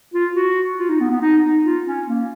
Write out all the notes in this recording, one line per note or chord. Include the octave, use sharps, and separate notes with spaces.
F4
F#4
F4
D#4
B3
B3
D#4
D#4
F4
C#4
A#3